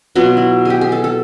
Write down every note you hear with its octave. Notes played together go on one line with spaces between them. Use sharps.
B2 F#3 B3 F4
E4
G4 G#4
G#4
A4
A4